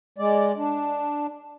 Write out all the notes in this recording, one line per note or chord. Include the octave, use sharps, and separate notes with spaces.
G#3 D5
D4